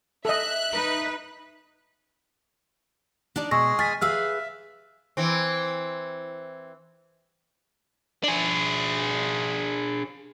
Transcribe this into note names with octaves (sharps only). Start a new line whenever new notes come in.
A4 D#5 E5 F#6
D#4 B4
D4 D#4 D5
B2 G#3 G#4 C#6 E6 A#6
G#5 F6 A6 B6
G#4 B4 E5 F5 E6 F6
E3 C4
D4 G#4